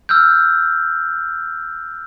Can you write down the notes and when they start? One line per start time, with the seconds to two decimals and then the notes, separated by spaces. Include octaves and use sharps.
0.09 E6 F6 G6